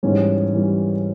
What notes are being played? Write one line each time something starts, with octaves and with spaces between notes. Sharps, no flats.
G#2 E3 G3 C#4
G#2 E3 G3